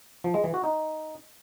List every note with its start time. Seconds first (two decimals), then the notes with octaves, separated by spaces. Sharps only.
0.24 F3
0.34 G#3
0.44 E3
0.54 F#4
0.64 D#4